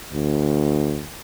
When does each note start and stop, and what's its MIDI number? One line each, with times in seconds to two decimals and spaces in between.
0.14 1.04 38